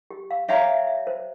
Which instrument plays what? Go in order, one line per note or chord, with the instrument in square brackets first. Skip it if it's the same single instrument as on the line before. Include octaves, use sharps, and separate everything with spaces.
[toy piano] G4
F5
[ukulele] G4 C#5 F5 A#5 [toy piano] E5
[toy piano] E5
E5
C5